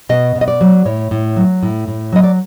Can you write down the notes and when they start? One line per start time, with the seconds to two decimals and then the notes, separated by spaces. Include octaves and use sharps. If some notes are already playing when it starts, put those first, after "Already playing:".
0.09 B2 D#5
0.36 B2
0.41 D#5
0.48 D5
0.61 F#3
0.85 A2 C#5
1.11 A2
1.36 F#3
1.63 A2
1.88 A2
2.12 F#3 D#5
2.24 D5